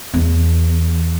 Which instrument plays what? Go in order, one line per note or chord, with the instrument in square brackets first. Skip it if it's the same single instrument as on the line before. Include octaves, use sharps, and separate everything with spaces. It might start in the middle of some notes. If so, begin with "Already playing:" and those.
[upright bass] E2